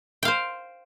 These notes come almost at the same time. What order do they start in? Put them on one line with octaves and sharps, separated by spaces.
G5 F5 C5